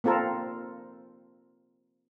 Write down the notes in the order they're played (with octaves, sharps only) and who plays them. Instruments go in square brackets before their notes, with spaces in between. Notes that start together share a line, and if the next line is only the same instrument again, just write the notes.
[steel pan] A#3 C4 F4 A4 A#4